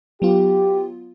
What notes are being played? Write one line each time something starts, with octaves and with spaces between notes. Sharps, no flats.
F#3 B3 F4 G4